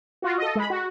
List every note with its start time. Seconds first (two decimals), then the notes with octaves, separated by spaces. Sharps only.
0.22 F4 F#4
0.38 A4 D#5
0.55 G#3 B5
0.70 F#4